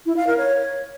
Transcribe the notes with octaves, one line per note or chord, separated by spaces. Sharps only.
E4
F5
A#4
C#5